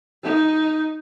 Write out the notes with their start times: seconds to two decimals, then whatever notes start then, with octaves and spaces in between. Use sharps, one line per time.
0.24 D#4